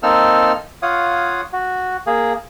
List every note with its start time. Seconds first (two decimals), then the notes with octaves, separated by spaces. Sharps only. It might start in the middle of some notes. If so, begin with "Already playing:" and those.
0.03 A#3 C4 D#4 A4 E6 F6
0.82 F4 C#5 F5 F#5 D#6
1.53 F#4
2.07 A#3 G#4